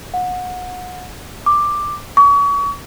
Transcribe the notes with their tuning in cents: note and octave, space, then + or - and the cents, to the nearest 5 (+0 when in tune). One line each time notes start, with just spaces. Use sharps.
F#5 -25
D6 +5
C#6 +35